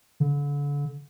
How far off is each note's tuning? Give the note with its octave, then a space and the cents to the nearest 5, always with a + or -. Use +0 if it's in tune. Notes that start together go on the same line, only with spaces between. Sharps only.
D3 -35